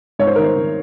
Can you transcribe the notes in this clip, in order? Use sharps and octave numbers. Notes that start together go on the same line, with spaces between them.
G#2 C#5
C5
D#3 A#4
C5
D#3